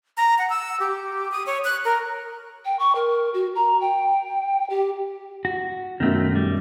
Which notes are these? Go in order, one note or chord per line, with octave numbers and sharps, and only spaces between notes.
A#5
F#5
E6
G4
D#6
C#5
F#6
A#4
G5
C#6
A#4
F#4
A#5
G5
G4
F#4
F#2 B2 D#3 A3
G3